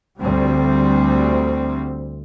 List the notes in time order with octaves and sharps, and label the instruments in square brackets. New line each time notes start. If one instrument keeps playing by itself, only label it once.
[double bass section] D2 G3 C4